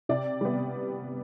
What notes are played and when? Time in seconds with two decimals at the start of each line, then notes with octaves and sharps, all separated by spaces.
0.09 C3 D5
0.41 G3 B3